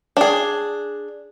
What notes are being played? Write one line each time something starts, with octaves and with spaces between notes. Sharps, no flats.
D4 G#4